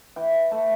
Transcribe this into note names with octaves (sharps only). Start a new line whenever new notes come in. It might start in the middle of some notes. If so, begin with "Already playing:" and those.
E3 G5
A3 A5